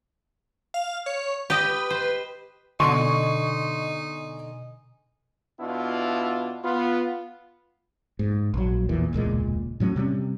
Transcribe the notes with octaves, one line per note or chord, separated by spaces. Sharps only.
F5
C#5
G4 B4 D#5
C5
B2 D3 D#4 D#5 G#5 C6 C#6
B2 B3 D4 E4 F4
B3 F4
G#2
A#1 F#3
E2 A#2 E3
E1 C#2 A#2 G#3
A2 F#3 G3 C#4
C3 G3 C4 C#4